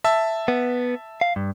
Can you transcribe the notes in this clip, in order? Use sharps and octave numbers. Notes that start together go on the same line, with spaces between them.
E5 A5 E6
B3
F5
G2